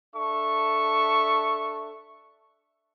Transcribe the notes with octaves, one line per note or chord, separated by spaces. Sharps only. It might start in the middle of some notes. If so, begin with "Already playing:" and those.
D4 A4 E5 C#6